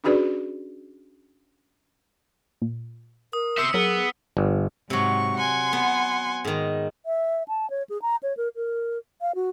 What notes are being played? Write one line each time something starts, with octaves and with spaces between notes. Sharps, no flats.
C#4 D4 F#4 G#4 B4 D5
A#2
A#4 D#6
C5 E5 E6 C#7
F#3 B3 G#4 A#4
G1
G#2 C3 F#3 C#6
F#5 G#5 C6
B3
G#2 D#3
E5
A5
C#5
G#4
A#5
C#5
A#4
A#4
F5
F#4